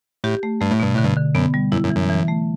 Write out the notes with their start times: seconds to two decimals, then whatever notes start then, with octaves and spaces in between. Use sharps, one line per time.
0.24 A2 G4
0.43 A3
0.61 G2 A3
0.71 A2
0.80 G2 B2
0.94 A2 D3
1.05 G2
1.17 D3
1.35 F#2 B3
1.54 G3
1.72 F#2 E4
1.84 F#2
1.90 E3
1.96 F#2
2.09 E3
2.28 A3